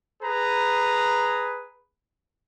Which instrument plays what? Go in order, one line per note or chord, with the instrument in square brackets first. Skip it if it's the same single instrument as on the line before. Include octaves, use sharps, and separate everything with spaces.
[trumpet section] G#4 B4 A#5